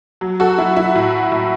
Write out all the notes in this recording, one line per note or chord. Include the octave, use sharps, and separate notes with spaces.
F#3
F#4 A4
F#3 E4
E4
A2
A2